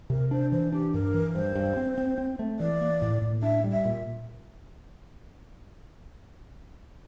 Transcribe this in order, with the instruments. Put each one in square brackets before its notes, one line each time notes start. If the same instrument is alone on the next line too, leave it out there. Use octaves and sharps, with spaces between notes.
[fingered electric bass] C3 [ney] A#4
[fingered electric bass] D4 [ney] C5
[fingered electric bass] E3 [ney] C5
[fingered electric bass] D4 [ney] G4
[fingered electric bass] G2 [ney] A#4
[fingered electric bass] E3
[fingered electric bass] G2 [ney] C5
[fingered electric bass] G2
C4
C4
C4
A3
[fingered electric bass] E3 [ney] D5
[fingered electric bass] A#3
A2
A2
[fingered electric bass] D4 [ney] E5
[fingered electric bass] G3
[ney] E5
[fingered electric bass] A#2